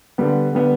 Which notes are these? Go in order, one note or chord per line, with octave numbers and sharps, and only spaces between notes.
D3 G3 B3
D3 G3 B3